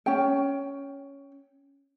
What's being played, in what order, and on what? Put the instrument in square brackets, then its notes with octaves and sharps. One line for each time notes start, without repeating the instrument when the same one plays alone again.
[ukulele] C#4 G5